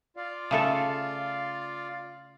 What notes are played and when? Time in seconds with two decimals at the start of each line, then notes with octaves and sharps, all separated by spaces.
0.17 F4 D5 F5
0.51 C#3 A3 A4